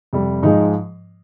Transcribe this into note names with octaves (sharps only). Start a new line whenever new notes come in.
F2 C3 G3
G#2 F3 G#3 D#4